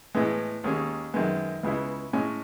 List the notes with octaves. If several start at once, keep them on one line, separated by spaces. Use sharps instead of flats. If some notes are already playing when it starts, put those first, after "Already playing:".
A2 E3 G#3 B3
D#2 D#3 G#3 C#4
F#2 D#3 G#3 B3
C#2 C#3 G#3 B3 E4
A2 G#3 C#4